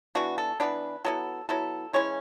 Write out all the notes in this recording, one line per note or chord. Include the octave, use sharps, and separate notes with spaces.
E3 B3 D4 F#4
A4
E3 B3 D4 B4
F#3 B3 E4 A4
F#3 B3 E4 A4
E3 G#3 C#4 E4 C#5